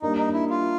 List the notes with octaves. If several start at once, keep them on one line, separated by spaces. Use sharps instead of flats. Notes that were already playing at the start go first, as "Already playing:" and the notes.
G3 A#3 D4 D#4
D#4
E4
F4